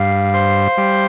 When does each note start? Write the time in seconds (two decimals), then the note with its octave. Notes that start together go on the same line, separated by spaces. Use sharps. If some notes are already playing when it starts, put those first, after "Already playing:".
Already playing: G2 F5
0.34 C5
0.78 G3